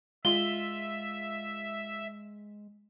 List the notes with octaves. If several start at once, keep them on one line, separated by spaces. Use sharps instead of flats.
G#3 F4 E5 G7